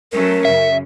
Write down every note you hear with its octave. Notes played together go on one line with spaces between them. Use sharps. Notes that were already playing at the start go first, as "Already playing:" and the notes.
F#3 A3 C#4 A#4
F#2 C#3 E5